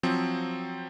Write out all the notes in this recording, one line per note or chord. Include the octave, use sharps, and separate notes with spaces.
F3 F#3 C4